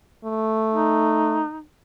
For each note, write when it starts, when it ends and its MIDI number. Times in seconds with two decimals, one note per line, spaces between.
0.25 1.43 57
0.73 1.63 63